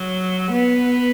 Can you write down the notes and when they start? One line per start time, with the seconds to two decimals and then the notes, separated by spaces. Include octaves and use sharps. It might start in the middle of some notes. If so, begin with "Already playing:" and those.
Already playing: F#3
0.51 B3